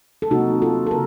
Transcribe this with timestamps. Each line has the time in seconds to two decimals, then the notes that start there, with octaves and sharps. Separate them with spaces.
0.22 A4
0.31 C3 F#3 A#3 D#4 F#4
0.62 F4 A4
0.87 A4
0.91 C#3 A#4